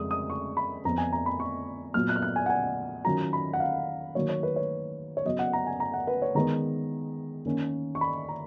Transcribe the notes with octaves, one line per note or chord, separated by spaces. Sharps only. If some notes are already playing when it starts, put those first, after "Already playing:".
Already playing: F2 C#3 G#3 D#6
D#6
C#6
B5
F2 F3 B3 A#5
G#5
A#5
B5
C#6
A#2 F#3 B3 F4 F6
F#6
F6
F#6
G#5
F#5
G#5
D#3 F#3 C#4 F4 A#5
B5
F#5
F5
D#3 F#3 A#3 C#5
C#5
B4
C#5
C#5
C#3 F#3 B3 D#5
F#5
A#5
G#5
A#5
F#5
B4
C#5
D#3 G#3 B3 A#5
D#3 A#3 C#4
C#6
B5
A#5